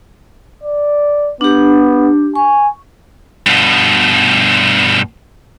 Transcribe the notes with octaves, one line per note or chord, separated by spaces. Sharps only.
D5
B3 D4 G4
G#5 C#6
G2 B2